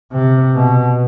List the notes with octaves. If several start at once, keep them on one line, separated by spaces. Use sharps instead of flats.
C3
B2